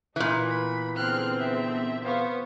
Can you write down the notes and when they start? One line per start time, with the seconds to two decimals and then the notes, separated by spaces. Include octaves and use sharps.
0.16 A#2 E3 D#4 B4
0.49 B3 B5
0.96 D3 B3 C4 G#4 F6 F#6
1.40 E5
2.05 B3 C5 F5 C#6